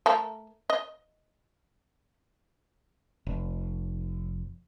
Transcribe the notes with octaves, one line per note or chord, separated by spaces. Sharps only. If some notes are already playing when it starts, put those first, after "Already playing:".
A3 A4 A#4
D#5
F1